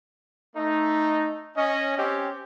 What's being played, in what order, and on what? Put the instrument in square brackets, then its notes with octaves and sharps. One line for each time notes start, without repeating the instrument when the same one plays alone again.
[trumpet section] A3 D#4
C#4 D#5
C4 C#4 G4 C#5